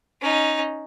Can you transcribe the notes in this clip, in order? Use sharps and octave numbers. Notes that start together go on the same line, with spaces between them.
C#4 D#4